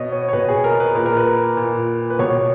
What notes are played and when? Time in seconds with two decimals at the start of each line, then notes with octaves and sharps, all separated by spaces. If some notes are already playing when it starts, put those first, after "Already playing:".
Already playing: B2 C#5 D#5
0.12 C#5
0.28 C#5
0.33 B2 B4
0.48 G#4
0.64 A#4
0.80 B4
0.95 A#2 B4
1.06 A#4
1.17 B4
1.57 A#2
2.10 B4
2.19 B2 C#5